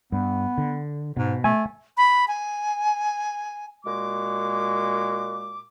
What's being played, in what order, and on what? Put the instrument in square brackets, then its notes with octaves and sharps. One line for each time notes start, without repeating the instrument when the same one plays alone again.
[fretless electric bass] G2 [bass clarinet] B3
[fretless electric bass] D3
[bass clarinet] G#2 [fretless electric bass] B2
[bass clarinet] A3 [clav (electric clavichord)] G#5
[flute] B5
G#5
[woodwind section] A#2 G#3 F#4 D6